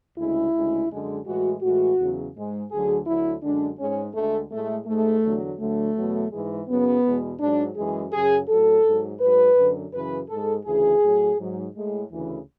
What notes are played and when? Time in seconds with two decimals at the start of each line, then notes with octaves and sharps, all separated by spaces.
0.17 D2 C#3 G#3 E4
0.54 D2 C#3 G#3
0.90 F#2 D3 G#3
1.26 A2 E3 G#3 F#4
1.62 A2 E3 G#3 F#4
1.98 E2 C#3 F#3
2.35 G#2 G#3
2.71 D2 D3 F#3 G#4
3.06 D2 D3 F#3 E4
3.43 F#2 D3 G#3 D4
3.79 G#2 G#3 C#4
4.14 D2 D3 G#3 A3
4.51 A2 G#3 A3
4.87 G#2 G#3 A3
5.23 E2 D3 F#3
5.59 D2 D3 F#3 A3
5.96 E2 B2 F#3
6.32 G#2 E3 G#3
6.68 F#2 C#3 F#3 B3
7.04 E2 B2 G#3
7.40 G#2 F#3 D4
7.76 F#2 E3 G#3 G#4
8.12 F#2 C#3 F#3 G#4
8.49 A2 F#3 A4
8.85 G#2 F#3
9.20 G#2 F#3 B4
9.57 F#2 D3 F#3
9.92 F#2 C#3 E3 B4
10.29 G#2 G#3 A4
10.65 D2 C#3 E3 G#4
11.01 A2 F#3
11.37 G#2 F#3
11.74 A2 G#3
12.10 D2 C#3 E3